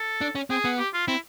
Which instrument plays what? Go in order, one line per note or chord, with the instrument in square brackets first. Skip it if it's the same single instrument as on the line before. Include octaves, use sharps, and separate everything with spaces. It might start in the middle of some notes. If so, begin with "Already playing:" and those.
Already playing: [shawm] A4
[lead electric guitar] D4
C#4
[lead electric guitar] C4 [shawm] G#4
[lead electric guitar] B3
[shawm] G4
F4
[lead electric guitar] C4 [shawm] E4